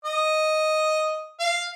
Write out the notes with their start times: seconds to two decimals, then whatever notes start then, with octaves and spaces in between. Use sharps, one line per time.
0.05 D#5
1.39 F5